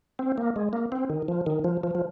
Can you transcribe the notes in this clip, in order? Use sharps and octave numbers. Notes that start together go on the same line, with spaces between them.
C4
A#3
G#3
A#3
C4
D#3
F3
D#3
F3
F3
F3